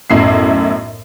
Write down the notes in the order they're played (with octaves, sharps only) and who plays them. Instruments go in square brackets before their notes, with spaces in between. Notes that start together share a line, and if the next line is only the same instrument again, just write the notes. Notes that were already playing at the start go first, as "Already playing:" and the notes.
[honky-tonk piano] B1 F#2 A2 C7